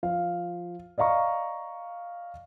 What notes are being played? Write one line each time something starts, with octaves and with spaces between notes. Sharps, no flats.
F3 F5
D5 D#5 F5 A#5 C#6